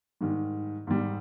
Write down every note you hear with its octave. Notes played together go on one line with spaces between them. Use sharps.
G#2 D#3 G3
G#2 D#3 G3